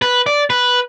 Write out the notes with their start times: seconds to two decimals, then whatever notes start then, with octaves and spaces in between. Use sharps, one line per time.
0.02 B4
0.26 D5
0.50 B4